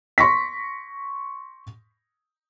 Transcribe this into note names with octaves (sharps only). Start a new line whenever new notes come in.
C6 C#6 A#6 B6